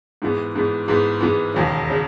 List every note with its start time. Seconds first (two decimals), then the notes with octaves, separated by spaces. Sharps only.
0.22 G#2 E3 B3
0.55 G#2 E3 B3
0.88 G#2 E3 B3
1.21 G#2 E3 B3
1.54 E1 D#2 C#3
1.90 C#3